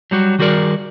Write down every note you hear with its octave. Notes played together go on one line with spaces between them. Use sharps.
F#3 G3 F#4
D#3 G3 F#4 G#4 A#4 D5